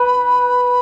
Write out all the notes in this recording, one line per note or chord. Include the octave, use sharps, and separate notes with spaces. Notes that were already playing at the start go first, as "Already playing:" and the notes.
Already playing: B4 B5